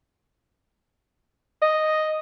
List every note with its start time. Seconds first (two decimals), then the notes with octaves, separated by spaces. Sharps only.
1.62 D#5